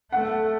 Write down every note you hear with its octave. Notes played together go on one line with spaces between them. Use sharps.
A3 F#5